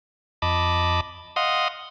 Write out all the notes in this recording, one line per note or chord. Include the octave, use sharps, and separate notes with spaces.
F2 D#5 A5 B5 D6
D#5 F5 F#5 C6 D#6